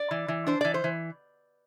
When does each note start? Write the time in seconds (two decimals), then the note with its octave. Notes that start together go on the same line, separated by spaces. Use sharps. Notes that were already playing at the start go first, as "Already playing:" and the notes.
Already playing: D5
0.11 E3
0.28 E3
0.47 D4 C5
0.61 E3 D5
0.74 C5
0.84 E3